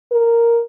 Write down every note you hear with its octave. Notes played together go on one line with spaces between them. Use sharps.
A#4